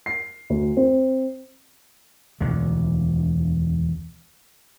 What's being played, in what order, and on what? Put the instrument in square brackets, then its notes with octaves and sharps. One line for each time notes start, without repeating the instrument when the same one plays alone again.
[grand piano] C7
D2
C4
[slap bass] E1 D2 D3